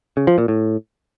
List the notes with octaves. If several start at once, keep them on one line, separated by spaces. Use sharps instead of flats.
C#3
F3
A#2
A2